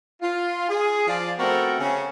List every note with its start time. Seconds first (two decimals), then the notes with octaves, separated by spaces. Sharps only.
0.21 F4
0.69 G#4
1.07 F3 F4 D5
1.38 A3 B3 C4 F#4 A4 A#4
1.79 C#3 C#4